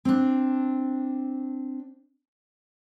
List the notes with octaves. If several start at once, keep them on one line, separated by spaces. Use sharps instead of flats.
C4 D4